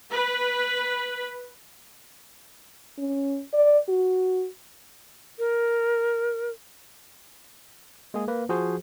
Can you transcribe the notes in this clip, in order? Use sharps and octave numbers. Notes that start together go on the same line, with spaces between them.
B4
C#4
D5
F#4
A#4
G#3 A#3 G#4
A#3 B4
F3 F#4 G#4 C5